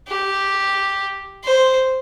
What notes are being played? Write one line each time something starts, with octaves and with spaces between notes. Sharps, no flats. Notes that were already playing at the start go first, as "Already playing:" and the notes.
G4
C5